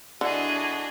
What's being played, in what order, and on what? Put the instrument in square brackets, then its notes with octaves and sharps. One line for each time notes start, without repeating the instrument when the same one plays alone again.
[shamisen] D3 [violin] D4 G#4 [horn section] E4 F#4 [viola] D#5 G#5